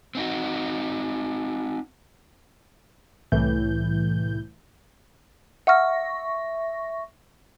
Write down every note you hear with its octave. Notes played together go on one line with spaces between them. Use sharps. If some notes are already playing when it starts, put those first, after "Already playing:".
C4 D#4 F#4
C2 A2 E3 G6
E5 F#5 C#6 F6 A#6